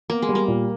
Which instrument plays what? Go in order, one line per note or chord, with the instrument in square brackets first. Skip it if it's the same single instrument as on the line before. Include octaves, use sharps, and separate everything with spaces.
[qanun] A#3 [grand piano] B3
[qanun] G#3
[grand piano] G3
[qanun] A#3
[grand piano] A#2